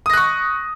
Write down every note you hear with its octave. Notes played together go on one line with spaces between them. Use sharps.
C#6 D#6 F#6 A#6